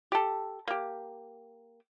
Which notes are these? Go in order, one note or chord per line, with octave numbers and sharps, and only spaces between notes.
G4 A4
A#3 G4